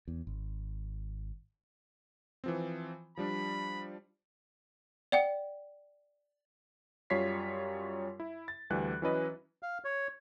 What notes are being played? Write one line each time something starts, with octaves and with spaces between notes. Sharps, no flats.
E2
G#1
E3 F3 C4
F3 G3 D4 B5
D5 F#5 G5
F#2 G3 F4 C#5 B6 C7
E4
A6
D2 E3 G3 F#6
E3 F#3 C#4 E4 B4 D#5
F5
C#5